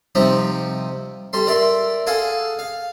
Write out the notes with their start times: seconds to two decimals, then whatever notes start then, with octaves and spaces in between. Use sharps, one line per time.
0.15 C3 F3 G3 D#4 G4
1.33 G3 A4 C6
1.47 A#4 D5 E5 C6
2.07 G#4 A4 F5 F#5
2.59 F5